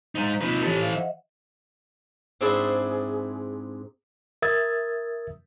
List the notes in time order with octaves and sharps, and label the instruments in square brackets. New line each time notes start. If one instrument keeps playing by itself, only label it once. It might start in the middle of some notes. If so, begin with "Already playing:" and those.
[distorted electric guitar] G#3 D#4 [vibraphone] C5 F5 A#5
[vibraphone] A#3 C4 F4 [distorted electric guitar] D#4 B4
[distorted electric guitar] E3 A4 [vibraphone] G4 C5 C#5
[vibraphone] C5 F5
D#5 E5 F#5
[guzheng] G#2 C4 D4 E4 G#4
[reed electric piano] A#4 E5 D#6 E6 G#6 A6